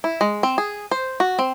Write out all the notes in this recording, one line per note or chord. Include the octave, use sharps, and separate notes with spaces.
E4
G#3
C4
G#4
C5
F#4
C4